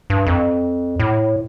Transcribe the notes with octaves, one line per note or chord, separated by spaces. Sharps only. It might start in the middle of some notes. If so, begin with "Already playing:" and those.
G2
F2
A2